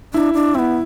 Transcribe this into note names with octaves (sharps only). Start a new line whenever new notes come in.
D4 E4
D4
B3 C4 E4